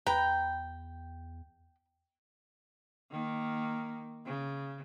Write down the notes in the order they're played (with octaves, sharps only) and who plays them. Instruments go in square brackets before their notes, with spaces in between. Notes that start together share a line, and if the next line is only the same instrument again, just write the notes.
[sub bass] E2 [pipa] B4 A#5 [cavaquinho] G5
[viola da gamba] D#3 A#3
C#3